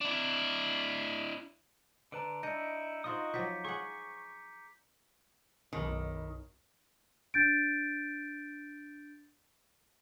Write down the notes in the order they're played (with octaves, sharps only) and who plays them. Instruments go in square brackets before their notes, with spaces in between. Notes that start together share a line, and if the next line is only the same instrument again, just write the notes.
[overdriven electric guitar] D4 E4
[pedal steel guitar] D3 B4 A5 [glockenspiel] A#5 D7
[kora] D4 [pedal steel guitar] E4 D#5 [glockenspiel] G6 C#7 D#7
[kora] D#4 F4 C5 [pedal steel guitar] F#4 D#5 D#6
[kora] F3 F#3 [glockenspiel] D6 G6 B6
[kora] G#4 F#5 [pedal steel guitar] C#6
[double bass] B1 F#2 [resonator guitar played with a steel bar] D#3
[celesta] D4 G6 A6 D7